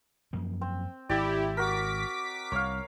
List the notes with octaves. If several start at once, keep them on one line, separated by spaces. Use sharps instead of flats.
F#2 F3 A#3
C4
G#1 E4 G4 D5
F#4 A#4 D6 B6
C2 C#5 F5